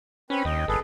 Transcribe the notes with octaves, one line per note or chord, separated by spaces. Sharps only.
C4 C#4 B4 B5
D#2 D#5 G5
G1 G#4 A4 B4